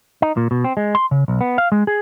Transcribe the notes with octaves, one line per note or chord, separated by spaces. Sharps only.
D#4
A#2
B2
C4
G#3
C6
C#3
B1
B3
F5
G#3
G#4